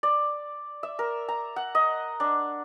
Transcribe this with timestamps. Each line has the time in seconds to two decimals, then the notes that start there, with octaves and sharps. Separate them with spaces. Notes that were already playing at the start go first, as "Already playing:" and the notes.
0.03 D5
0.83 E5
0.99 A#4
1.29 A#5
1.56 F#5
1.75 D#5
2.20 D4